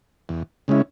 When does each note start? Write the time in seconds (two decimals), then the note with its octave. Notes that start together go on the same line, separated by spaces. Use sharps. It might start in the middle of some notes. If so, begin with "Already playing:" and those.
0.29 E2
0.68 C#3 G#3 C#4 E4